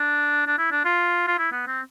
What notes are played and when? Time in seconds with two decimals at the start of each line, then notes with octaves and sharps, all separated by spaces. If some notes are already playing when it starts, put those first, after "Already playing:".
Already playing: D4
0.46 D4
0.58 E4
0.71 D4
0.85 F4
1.27 F4
1.39 E4
1.52 B3
1.67 C4